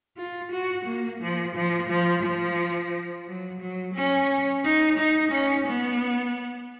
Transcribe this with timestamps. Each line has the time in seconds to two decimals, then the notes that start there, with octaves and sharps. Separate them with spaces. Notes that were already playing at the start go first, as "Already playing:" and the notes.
0.17 F4
0.52 F#4
0.86 A#3
1.21 F3
1.56 F3
1.90 F3
2.23 F3
3.27 F#3
3.60 F#3
3.95 C#4
4.64 D#4
4.98 D#4
5.32 C#4
5.67 B3